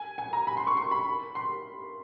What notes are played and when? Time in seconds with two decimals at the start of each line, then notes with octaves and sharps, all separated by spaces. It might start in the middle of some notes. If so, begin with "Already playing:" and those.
Already playing: G#5
0.18 G#5
0.33 A#5
0.47 B5
0.57 C6
0.67 C#6
0.77 C6
0.91 B5
1.35 C6